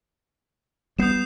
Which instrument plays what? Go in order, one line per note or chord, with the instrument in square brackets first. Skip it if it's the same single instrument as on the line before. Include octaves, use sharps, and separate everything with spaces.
[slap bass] G3 B3 [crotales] D#6 G6 C7 E7